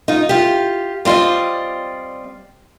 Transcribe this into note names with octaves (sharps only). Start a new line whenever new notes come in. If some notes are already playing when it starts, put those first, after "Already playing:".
D#4 F4
F4 G4
G3 C4 F4 D5 D#5